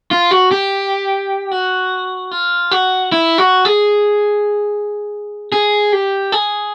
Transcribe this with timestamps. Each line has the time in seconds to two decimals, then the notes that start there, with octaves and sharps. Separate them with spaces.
0.11 F4
0.31 F#4
0.51 G4
1.51 F#4
2.31 F4
2.71 F#4
3.12 E4
3.38 F#4
3.65 G#4
5.52 G#4
5.93 G4
6.32 G#4